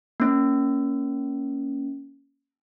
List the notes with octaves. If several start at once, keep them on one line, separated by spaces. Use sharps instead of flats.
A#3 C#4